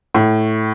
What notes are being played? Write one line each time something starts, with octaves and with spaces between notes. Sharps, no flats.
A2